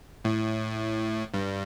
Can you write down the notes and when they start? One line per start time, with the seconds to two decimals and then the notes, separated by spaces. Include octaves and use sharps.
0.25 A2
1.34 G2